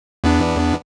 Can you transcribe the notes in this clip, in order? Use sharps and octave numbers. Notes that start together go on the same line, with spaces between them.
E2 B3 D4